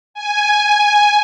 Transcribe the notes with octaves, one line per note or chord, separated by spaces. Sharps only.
G#5